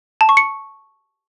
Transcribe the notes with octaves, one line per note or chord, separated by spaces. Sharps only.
A5
C#6
C#7